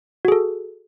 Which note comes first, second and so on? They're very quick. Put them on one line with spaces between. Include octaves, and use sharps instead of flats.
F#4 G#4 A4